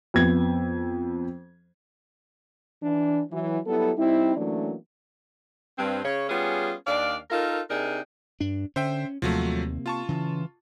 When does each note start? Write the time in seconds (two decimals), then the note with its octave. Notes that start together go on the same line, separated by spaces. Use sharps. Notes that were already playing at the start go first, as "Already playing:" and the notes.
0.14 F2 B3 G#6
2.82 E3 D4
3.32 E3 F#3
3.66 F#3 G3 B3 E4 A4
3.97 G3 C4 D#4 E4
4.36 E3 F#3 A3 A#3 C#4 D4
5.78 G2 C4
6.04 C#3 C#5
6.29 G3 B3 C#4 F4 G#4
6.87 D#2 D4 D5 F5
7.31 D#4 F4 A4 A#4
7.70 C3 D4 D#4 G#4 A#4
8.40 G2 D4
8.76 D3 C#4 C5 E5 G5
9.22 D#2 C3 F3 F#3 A3 A#3
9.86 F4 A5 C#6
10.09 C#3 E3